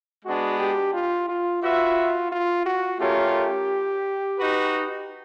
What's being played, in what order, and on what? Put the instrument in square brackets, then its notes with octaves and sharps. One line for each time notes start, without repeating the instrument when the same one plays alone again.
[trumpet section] G#3 B3 D4 [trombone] F#4
[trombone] G4
F4
F4
[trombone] F4 [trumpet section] F#4 B4 E5
[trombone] F4
F#4
[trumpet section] A3 C#4 F4 A#4 C#5 [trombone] G4
[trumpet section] D#4 F#4 B4